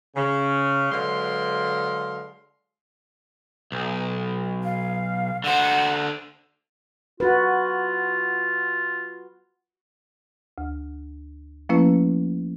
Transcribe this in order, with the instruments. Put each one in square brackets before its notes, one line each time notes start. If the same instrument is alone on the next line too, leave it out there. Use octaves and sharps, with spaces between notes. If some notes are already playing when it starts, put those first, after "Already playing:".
[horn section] C#3
D3 F#3 G#3 B4 F5 C6
[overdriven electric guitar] B1
[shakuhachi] F5
[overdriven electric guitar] D3 C5 [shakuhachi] F#5
[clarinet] F4 [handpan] F#4 B4
[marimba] D2
F3 A3 A#3 C#4 E4 B4